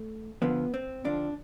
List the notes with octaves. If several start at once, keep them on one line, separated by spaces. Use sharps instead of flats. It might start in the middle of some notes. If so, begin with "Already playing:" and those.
Already playing: A3
F2 D3 F3 B3
C4
F2 D3 F3 D4